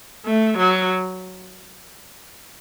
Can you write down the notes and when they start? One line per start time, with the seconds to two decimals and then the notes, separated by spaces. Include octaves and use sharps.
0.26 A3
0.58 F#3